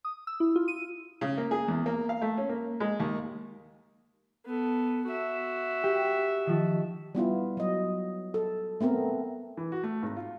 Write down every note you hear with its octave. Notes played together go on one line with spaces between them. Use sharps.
D#6
E6
E4
F4
D#7
C#3
A#3
G#4
E2
A#3
F5
A3
C#4
A#3
G#3
D#2
B3 A4
F#4 E5
G4
D#3 F3
G3 B3 E4 F4
F#3 D#5
A4
A3 B3 C4 A#4
E3
F#4
A3
G#1
F4